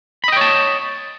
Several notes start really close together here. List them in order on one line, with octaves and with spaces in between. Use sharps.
B5 D#5 G5 C#5 A5